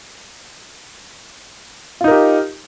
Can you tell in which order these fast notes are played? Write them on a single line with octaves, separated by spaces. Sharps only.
F4 D#4 A#4 G4